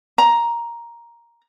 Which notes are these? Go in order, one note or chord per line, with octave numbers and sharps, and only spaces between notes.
A#5